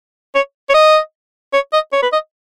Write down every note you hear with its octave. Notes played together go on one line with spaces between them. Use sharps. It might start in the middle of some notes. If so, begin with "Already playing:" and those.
C#5
C#5
D#5
C#5
D#5
C#5
B4
D#5